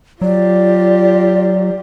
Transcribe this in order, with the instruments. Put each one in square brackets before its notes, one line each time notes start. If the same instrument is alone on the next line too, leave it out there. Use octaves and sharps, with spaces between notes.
[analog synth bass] F#3 [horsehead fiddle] F4 G4 [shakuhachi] D5